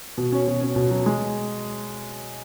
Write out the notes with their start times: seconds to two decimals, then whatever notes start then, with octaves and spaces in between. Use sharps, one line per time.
0.18 B2
0.32 C#4
0.48 B2
0.61 C#4
0.76 B2
0.91 F#3
1.06 G#3